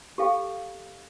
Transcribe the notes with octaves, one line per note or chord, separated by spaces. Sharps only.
G4 A4 F5 G5